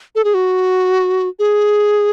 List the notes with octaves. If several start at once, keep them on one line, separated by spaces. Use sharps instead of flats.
A4
G#4
F#4
G#4